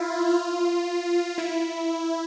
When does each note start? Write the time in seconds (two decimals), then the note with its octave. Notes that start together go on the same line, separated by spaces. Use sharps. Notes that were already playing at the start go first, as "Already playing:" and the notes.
Already playing: E4 F4
0.29 F4
1.38 E4